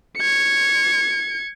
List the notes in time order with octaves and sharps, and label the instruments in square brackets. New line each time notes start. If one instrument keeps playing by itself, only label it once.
[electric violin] G#6 C#7